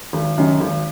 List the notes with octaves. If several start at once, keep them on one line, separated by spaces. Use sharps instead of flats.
G#1
F#2 D#3
G#1